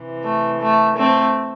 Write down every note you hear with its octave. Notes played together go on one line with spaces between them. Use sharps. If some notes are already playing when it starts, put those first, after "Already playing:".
Already playing: C3 E3
A3
A3
A3 C4